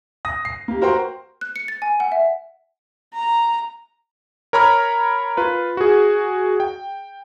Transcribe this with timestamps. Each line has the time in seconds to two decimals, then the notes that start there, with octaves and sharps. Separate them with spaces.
0.25 D#6 A#6
0.45 C7
0.68 A#3 G4
0.81 F#4 A#4 C5 G5 C6
1.41 F#6
1.56 C#7
1.68 A6
1.82 G#5
2.00 F#5
2.12 E5
3.15 A#5
4.53 A#4 C#5 A#5 B5 F6
5.37 F4 B4
5.77 F#4 G#4
6.60 G5